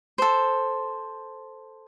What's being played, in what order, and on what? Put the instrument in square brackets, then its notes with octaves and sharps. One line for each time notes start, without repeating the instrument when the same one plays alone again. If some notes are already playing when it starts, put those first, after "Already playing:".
[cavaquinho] A4 C5